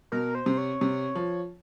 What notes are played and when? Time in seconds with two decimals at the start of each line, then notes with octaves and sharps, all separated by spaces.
0.12 B2 A#4
0.35 C5
0.46 C3
0.58 C#5
0.81 C3
1.15 F3